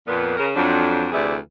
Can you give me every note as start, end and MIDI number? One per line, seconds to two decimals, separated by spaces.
0.06 0.35 41
0.06 0.35 46
0.06 0.35 59
0.37 0.48 49
0.37 0.48 70
0.55 1.06 41
0.55 1.06 54
0.55 1.06 62
1.12 1.36 38
1.12 1.36 48
1.12 1.36 52
1.12 1.36 64
1.12 1.36 68
1.12 1.36 74